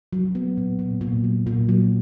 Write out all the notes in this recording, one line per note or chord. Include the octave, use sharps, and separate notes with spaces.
F#3
B3
A#2
A#2
A#2
F#3
A#2
F#3